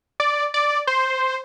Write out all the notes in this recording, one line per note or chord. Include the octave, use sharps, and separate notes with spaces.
D5
D5
C5